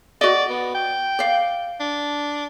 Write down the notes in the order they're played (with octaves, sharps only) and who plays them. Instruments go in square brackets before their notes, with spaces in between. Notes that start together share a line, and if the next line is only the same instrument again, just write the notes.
[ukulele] F#4 D#5 [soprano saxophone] D5
[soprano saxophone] B3
G5
[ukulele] D5 F5
[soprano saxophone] D4